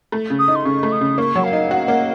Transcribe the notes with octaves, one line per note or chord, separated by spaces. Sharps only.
A3
C#3
D#6
D#4
C6
C#3 C#6
A3
D#6
C#3
A#3 C#6
F#3
F5
D#4
F#4
A#3